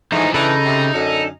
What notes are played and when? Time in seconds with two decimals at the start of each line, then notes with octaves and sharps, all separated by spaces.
0.12 G#2 D3 E3 F3 A3 D#4
0.34 C#3 E3 D4 D#4 A4 B5
0.65 C3
0.94 F#2 D3 A4